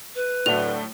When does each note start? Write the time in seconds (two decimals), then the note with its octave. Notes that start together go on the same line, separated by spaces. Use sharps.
0.15 B4
0.46 A2 D3 F#3 A3 F7